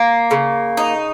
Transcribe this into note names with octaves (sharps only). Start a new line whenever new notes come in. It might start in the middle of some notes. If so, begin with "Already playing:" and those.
Already playing: A#3
C#3
D#4